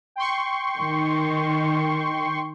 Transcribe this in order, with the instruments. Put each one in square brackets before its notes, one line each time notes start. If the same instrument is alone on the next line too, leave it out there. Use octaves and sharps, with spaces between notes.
[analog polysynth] G5 C6 C#6
[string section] D#3